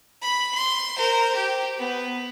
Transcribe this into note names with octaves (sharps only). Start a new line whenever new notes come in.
B5
C6
A#4 C5
G4
B3